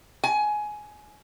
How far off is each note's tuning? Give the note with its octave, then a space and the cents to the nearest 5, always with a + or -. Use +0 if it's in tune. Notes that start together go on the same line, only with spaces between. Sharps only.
G#5 +15